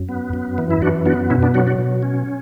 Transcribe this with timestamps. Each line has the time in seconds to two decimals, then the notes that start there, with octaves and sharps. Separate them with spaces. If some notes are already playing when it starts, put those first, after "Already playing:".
Already playing: F#2
0.09 B3
0.33 F#2
0.58 E3
0.71 E4
0.82 F#2 D4 F#4
1.06 B3 D4 F#4
1.30 B2 C#4 E4
1.43 D4
1.54 F#3 D4 F#4
1.67 D4 F#4
1.79 B2
2.03 C#4